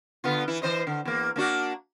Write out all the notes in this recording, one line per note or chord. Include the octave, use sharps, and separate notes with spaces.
D3 B3 F4
E3 E4
E3 C5 D#5
D3
E2 A#3
A#3 D4 F#4